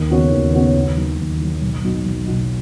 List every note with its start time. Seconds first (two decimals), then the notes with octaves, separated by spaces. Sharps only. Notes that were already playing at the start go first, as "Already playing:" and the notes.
Already playing: D#2
0.10 C#3 B3 F#4 C#5
0.31 D#2
0.54 C#3 B3 F#4 C#5
0.75 D#2
0.97 D#3 F#3
1.19 D#2
1.40 D#3 F#3
1.62 B1
1.84 B2 F#3 D#4 F#4
2.05 B1
2.27 B2 F#3 D#4 F#4